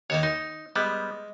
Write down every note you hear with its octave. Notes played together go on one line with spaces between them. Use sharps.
D#2 D#3 A#3 C#5
D#4 C6
G3 G#3 B3